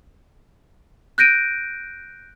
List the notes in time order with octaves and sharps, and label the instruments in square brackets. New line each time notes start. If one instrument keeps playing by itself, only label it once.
[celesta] F#6 G6 A#6 D7 D#7